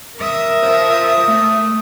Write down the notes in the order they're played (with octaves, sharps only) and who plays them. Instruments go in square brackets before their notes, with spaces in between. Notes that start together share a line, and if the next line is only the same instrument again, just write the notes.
[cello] A#4 E5 [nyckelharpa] D#6
[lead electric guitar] C5 F5
A3